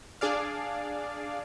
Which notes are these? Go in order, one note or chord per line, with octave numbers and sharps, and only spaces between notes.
D4 G#4 D5 F5